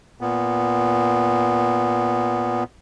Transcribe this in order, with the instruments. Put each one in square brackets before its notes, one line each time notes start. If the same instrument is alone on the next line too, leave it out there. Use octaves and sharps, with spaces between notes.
[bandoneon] A#2 B3